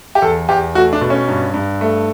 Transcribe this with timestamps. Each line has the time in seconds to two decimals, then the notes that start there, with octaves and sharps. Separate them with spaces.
0.15 G4
0.22 E2 A4
0.48 E2 G4
0.75 A3 F#4
0.93 D4
1.01 B2
1.10 C#4
1.28 G2
1.54 G2
1.81 A3